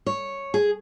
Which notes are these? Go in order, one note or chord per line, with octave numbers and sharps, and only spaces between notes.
C#5
G#4